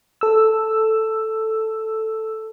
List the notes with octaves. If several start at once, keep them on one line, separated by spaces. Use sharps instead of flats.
A4 E6